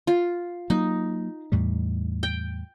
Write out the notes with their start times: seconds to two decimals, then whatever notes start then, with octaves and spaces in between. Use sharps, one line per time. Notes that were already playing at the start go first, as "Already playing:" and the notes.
0.07 F4
0.70 F#3 A#3 D#4
1.52 E2 A2 G3
2.23 G5